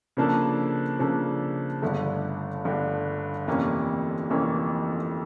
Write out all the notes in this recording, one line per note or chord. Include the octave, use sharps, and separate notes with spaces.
C#3 F3 A#3 D4 A4
C#3 F3 A#3 D4 A4
G1 G2 D3 A3
G1 G2 D3 A3
F1 F2 E3 A#3 C#4
F1 F2 E3 A#3 C#4